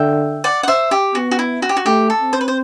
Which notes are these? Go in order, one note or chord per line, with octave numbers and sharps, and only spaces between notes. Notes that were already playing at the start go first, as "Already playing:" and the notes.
Already playing: D3 E5 G5
D5 F#5
F#5
C5 E5
G4
B3 F#4
F#4
E4
F#4
G4
F#4
A3 G4
A4
C4
C5
B4
C5